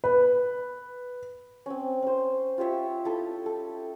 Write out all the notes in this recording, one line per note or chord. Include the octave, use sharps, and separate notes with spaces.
B4
C4 C#4
C#4 C5
F4 G4 C#5 E5
E4 A4 D#5
A4